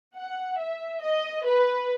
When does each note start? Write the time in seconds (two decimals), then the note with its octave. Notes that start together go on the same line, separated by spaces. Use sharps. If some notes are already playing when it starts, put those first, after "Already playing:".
0.16 F#5
0.59 E5
1.02 D#5
1.45 B4